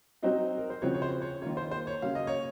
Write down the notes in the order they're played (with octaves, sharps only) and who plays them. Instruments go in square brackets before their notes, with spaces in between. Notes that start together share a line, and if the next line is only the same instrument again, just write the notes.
[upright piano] F#3 C4 D#4 F#4
[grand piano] A#4
C5
[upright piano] C#3 F3 C4 F#4 [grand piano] C#5
[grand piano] C#5
C5
C#5
[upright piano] D#3 A#3 F4 [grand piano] C#5
[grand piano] C5
C5
C#5
[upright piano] C#3 F#3 A#3 C#4 [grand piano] F5
[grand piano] D#5
C#5